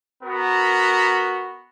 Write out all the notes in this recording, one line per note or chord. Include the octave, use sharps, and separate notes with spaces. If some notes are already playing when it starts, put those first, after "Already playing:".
B3 F#4 A#4